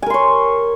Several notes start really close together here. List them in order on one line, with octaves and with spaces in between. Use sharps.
G#5 A#4 C6 C#5